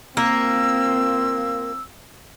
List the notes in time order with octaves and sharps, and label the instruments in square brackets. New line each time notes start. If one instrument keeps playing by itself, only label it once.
[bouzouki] A#3 [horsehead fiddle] C4 F4 [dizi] E6